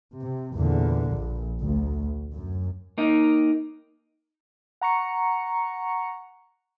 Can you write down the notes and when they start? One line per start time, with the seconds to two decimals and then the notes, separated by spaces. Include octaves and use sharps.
0.20 C3
0.54 E2 A#2 D3
1.12 A#1
1.60 D2
2.32 F#2
2.98 A#3 D#4
4.81 F#5 A#5 C#6 C#7